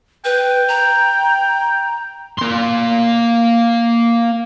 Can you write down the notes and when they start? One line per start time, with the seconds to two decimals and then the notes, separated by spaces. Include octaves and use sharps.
0.25 B4 G5
0.68 A#5
2.38 A#3 C6